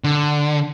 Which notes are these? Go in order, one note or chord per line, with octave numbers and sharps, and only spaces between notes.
D3